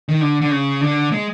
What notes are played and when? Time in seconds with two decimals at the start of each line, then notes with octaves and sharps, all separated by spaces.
0.09 D#3
0.21 D3
0.41 D3
0.51 C#3
0.81 D3
1.12 G#3